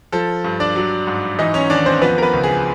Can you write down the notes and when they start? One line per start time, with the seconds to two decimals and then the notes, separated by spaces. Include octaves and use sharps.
0.12 F3 A4
0.44 G2
0.60 D4 D5
0.76 F#3
1.07 G#2
1.39 E3 D#4 D#5
1.54 C#4 C#5
1.70 D#2 D4 D5
1.86 C4 C5
2.01 F3 B3 B4
2.18 A#4
2.22 B3 B4
2.33 C#2
2.44 G#4